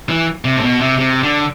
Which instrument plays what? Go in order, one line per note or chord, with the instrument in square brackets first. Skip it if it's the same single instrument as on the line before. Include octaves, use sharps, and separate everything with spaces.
[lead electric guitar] E3
C3
A2
B2
C3
C3
D3